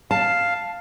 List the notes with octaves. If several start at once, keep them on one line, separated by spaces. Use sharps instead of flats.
F5 A5